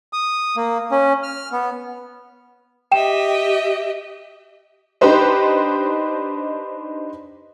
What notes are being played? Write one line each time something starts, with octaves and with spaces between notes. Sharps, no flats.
D#6
A#3
C#4
F6
B3
G4 D#5 E5 G5 E7
D4 D#4 G4 B4 C5 D#5